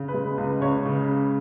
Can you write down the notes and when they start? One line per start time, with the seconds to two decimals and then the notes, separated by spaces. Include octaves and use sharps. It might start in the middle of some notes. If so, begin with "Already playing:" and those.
Already playing: C#3
0.08 B4
0.14 G#3
0.38 C#2
0.43 B4
0.61 C#2 C#5
0.85 C#3